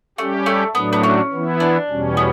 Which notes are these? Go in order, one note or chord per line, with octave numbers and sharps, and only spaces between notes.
G3 A3 C#4 G4
A3
A2 F#3 A3 B3 D4
B3
C#4
E3 B3 E4
D4
E2 B2 G3 C#4
B3